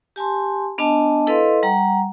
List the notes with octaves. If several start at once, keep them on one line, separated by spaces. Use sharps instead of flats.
G4 G#5 A5 C6
B3 D4 D#5 G#5 A5
E4 A4 B4 D#5 F5 C6
G3 F#5 A#5